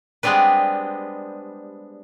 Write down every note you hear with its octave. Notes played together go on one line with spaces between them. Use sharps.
G3 G#3 B3 C4 D4 B4